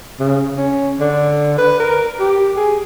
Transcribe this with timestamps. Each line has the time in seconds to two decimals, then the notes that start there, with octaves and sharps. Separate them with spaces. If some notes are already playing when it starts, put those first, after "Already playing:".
0.20 C#3
0.57 C#4
1.00 D3
1.58 B4
1.80 A#4
2.19 G4
2.57 G#4